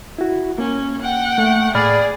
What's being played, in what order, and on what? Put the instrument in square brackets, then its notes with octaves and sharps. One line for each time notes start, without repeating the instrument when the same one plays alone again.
[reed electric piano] E4 F#4
[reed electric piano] A#3 [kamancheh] C#4
[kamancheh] F#5 G5
[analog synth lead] A3
[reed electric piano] A2 B5 F6 [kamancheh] G#4 [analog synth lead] D5